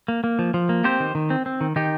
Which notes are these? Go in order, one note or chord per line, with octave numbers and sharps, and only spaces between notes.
A#3
A#3
F3
F3
A#3
C4 G4 C5
D#3
D#3
C4
C4
D#3
D#3 D#4 G4